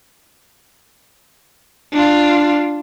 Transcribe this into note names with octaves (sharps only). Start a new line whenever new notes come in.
D4 F4